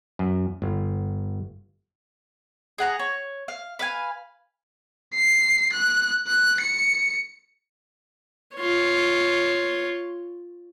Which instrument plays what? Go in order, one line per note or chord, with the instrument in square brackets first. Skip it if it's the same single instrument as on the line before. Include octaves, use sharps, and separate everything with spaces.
[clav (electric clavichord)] F#2
G1
[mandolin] G#4 F#5 A#5
C#5
F5
B4 F5 G#5
[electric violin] C7
F#6
F#6
C#7
[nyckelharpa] F4 C#5